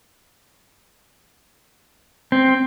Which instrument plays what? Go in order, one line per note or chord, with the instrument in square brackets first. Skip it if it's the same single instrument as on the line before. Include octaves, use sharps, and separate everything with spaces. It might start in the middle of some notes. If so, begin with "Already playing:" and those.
[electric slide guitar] C4